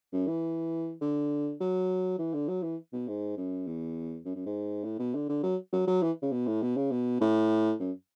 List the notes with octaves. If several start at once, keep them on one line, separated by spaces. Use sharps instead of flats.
F#2
E3
D3
F#3
E3
D3
F#3
E3
B2
G#2
F#2
E2
F#2
F#2
G#2
A2
B2
D3
D3
F#3
F#3
F#3
E3
C#3
B2
A2
B2
C#3
B2
A2
F#2